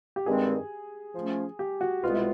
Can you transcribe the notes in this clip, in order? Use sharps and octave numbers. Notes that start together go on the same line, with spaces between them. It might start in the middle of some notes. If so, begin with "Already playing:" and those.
G4
G2 D#3 G#3 C4 G#4
F3 A3 C#4
G4
F#4
C2 B2 G#3 B3 F4
E4